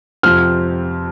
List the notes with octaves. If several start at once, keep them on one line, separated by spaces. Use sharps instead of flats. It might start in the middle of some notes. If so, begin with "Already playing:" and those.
F2 C3 F3 C4 F6